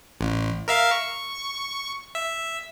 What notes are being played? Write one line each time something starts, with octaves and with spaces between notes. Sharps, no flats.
A1
A#4 E5 F5
C#6
E5